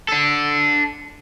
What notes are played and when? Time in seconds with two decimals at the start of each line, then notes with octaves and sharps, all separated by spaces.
0.09 D4 A4